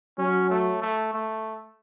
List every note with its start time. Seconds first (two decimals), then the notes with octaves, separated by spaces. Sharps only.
0.19 F#3 C#4
0.50 A3
0.82 A3
1.14 A3